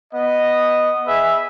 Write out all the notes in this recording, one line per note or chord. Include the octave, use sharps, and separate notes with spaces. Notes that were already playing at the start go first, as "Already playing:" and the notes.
B3 D#5
G#4 B4 E5